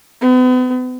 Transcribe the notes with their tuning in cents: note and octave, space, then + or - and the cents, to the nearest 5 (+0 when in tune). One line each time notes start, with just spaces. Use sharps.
B3 +40